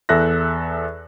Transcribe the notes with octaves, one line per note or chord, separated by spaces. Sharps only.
E2 A4 E5 F#6 A#6